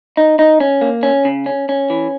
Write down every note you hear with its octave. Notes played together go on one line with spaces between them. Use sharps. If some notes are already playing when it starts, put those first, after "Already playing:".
D#4
D#4
C#4
A#3
C#4
C#3
C#4
C#4
E3